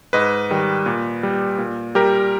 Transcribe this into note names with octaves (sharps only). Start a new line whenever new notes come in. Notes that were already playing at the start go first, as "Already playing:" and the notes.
G#2 B4 D#5
D#3 G3
A#2
G3
A#2
G3 G4 A#4